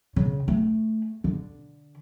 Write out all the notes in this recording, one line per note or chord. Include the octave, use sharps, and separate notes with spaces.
C#3
A3
D3